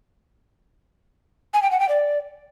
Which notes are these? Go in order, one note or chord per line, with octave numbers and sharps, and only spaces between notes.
G#5
G5
F#5
G5
D5